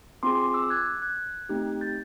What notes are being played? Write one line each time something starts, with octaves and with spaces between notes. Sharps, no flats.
C4 F4 G#4 C6 D6
D6 E6
F#6 G#6
F#6 G#6
A3 C4 D#4 G4
G6 A6